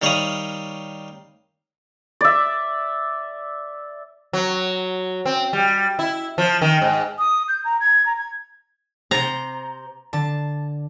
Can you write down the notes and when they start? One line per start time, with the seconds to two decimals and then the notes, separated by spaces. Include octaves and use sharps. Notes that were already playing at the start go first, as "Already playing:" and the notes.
0.02 D#3 G3 C#5 F5 B5 D#6
2.21 D5 E5
4.33 F#3
5.26 C4
5.53 G3
5.99 E4
6.38 F3
6.62 D#3
6.82 G#2
7.19 D#6
7.48 G6
7.64 A#5
7.80 G#6
8.06 A#5
8.18 G#6
9.11 C3 C5 A#5 A6 C7
10.13 D3 A5